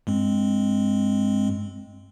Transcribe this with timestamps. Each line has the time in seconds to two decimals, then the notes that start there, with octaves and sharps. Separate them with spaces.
0.07 G2 G#3 C4